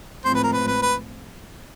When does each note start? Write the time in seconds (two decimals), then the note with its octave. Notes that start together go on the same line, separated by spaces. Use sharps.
0.25 A2 F3 G#3 C4 C5
0.35 B4
0.44 A#4
0.53 B4
0.67 B4
0.82 B4